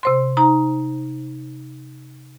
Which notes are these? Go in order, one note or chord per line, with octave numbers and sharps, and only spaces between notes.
C3 C5 C6
D#4 A#5